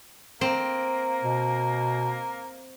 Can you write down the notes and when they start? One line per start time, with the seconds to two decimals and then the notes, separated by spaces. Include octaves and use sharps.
0.41 A#3 C4
1.23 B2